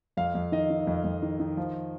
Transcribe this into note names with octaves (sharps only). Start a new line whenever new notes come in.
F2 F5
F2
D#3 D#5
D#3
F2
F2
D#3
D#3
F3